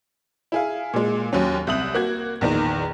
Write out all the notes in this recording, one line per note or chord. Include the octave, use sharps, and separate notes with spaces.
E4 G#4 F5
A#2 G#3
D#2 F#3 C#4
C2 E5 D#6 F#7
A#3 F#4 G#6
A#1 E2 D#3